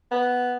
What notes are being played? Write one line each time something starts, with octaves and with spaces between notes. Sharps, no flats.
B3